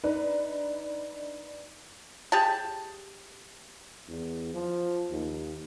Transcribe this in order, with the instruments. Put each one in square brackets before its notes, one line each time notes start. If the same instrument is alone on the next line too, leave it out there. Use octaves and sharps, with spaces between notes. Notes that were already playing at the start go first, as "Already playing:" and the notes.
[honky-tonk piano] D4 D#4 B4
[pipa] G4 G#4 A5
[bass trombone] E2
F3
D#2